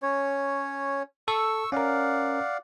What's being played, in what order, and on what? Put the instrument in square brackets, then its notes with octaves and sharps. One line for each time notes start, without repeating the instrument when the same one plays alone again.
[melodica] C#4 C#5
[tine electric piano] A4 [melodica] C#6 E6
[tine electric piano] C#4 A#4 [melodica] D5 F5 F#5